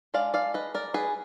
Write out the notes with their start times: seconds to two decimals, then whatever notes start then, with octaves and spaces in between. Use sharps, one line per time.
0.14 G#3 D4 D5 F5
0.34 D5 F5
0.54 B4 D#5
0.74 A#4 D5
0.94 G#4 B4